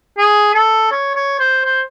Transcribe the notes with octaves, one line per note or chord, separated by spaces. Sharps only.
G#4
A4
C#5
C#5
C5
C5